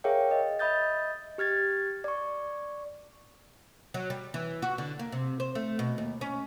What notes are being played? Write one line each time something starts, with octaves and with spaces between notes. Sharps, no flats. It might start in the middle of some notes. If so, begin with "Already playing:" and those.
G#4 A#4 C#5 E5 F5 G5
D#5
D#5 E5 B5 D#6 G6 A6
G4 F6 G#6 A6
D5 C#6
F#3
G3
E3
F#4
D3
A#3
C3
C5
A3
B2
D#2
C#4